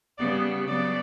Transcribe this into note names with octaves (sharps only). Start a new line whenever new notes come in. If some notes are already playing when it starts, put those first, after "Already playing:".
C#3 G3 B3 D5
C#3 F#3 B3 D5